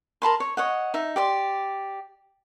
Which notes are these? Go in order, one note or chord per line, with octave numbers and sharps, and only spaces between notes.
A#4 A5 B5 C6
C#5
C#5 D#5 F#5
D#4 E5
G4 D5 C6